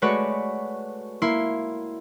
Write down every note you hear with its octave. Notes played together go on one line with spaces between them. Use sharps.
G#3 A3 F#4 B4 C#5 D5
A#3 E4 C6